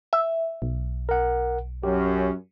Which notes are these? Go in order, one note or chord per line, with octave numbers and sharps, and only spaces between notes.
E5
B1
A#4 F#5
F#2 C#4 G4